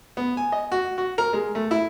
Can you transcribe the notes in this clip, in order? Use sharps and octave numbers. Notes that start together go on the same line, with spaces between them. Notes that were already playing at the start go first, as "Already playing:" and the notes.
B3
G#5
D#5
F#4
F#4
A#4
G#3
A3
E4